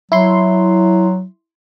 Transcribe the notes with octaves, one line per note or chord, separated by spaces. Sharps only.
F#3 E4 C6